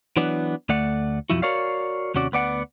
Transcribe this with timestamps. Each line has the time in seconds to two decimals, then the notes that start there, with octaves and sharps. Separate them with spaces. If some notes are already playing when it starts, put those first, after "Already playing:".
0.17 E3 F#3 B3 D4
0.69 D2 A3 D5 F#5
1.30 B1 F2 F3 E4 F#4
1.42 F#4 A#4 C#5 D5 F5
2.14 D#2 C3 C#4 F#4 D5
2.32 D2 B3 D5 F#5